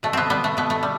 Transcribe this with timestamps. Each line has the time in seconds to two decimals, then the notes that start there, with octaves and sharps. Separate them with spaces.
0.03 B2 A3
0.13 B3 C4
0.30 G3 B3
0.44 A3
0.57 B2 B3
0.70 A3
0.83 G3